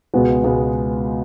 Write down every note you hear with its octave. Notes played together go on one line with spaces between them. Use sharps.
C#2 B2 G#3 B3
C#2 B2 G#3 B3